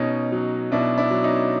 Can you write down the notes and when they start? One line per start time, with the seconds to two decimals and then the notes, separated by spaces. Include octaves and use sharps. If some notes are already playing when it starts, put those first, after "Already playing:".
Already playing: B2 C#4 D#4
0.32 F#3
0.71 B2 D4 E4
0.98 D4 E4
1.11 F#3
1.23 C#4 D#4